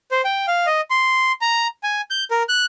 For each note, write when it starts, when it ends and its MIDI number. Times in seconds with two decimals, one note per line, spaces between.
0.11 0.21 72
0.25 0.46 79
0.48 0.66 77
0.66 0.81 75
0.90 1.32 84
1.41 1.67 82
1.83 2.01 80
2.11 2.24 91
2.31 2.43 70
2.49 2.66 90